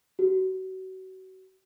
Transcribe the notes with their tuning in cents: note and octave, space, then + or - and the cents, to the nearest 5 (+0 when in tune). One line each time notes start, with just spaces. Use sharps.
F#4 +30